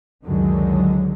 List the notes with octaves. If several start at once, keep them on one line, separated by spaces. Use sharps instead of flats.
C#2 F#2 D3 D#3 F#3 G#3